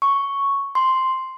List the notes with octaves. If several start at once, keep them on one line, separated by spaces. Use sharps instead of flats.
C#6
C6